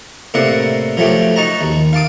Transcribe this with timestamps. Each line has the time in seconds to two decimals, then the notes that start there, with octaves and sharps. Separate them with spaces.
0.34 A2 C3 A#3 D5 F#5
0.97 F3 F#3 A3 G4
1.36 D#4 F#4 A5 A#5
1.61 D#2
1.93 F5 A5 D6 D#6